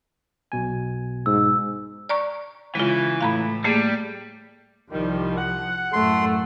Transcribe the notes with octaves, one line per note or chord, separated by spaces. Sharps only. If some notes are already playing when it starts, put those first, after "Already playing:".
B1 B2 G#5
G#2 E6
D5 A#5 C#6
C#3 E3 G#3 F4
A2 F5 A#5 B5
G3 A3 A#3 G#4
C2 D#3 F3 G3
F#5
F#2 A2 A3 C6